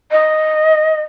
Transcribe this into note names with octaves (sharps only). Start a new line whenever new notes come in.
D#5